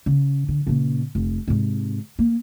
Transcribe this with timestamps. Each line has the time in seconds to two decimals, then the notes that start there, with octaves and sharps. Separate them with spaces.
0.06 C#3
0.49 D3
0.67 A#2 C#3
1.15 F1
1.48 G#2 C3
2.19 A#3